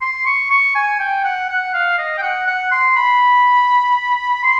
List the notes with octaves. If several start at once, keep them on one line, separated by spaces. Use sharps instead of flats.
C6
C#6
C#6
G#5
G5
F#5
F#5
F5
D#5
G5
F#5
F#5
C6
B5
C6